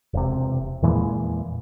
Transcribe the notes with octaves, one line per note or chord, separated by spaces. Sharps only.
E1 C3
E2 A#2 E3 G#3